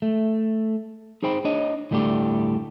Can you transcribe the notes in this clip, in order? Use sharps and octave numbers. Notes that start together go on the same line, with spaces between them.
A3
D#4 G#4 C5 G5 B5
D4 C#5 D#5
D2 A2 G3 A3 D4 G4